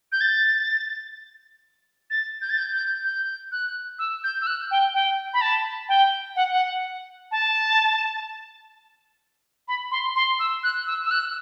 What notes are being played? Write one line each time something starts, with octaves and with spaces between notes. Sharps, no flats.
G6
A6
A6
G6
A6
G6
G6
G6
F#6
E6
G6
E6
F#6
G5
G5
B5
A5
G5
F#5
F#5
A5
B5
C6
C6
E6
F#6
E6
E6
F#6